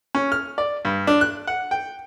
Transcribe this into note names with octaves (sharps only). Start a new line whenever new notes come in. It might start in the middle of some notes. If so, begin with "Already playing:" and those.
C#4
F6
D5
G2
D4
F#6
F#5
G5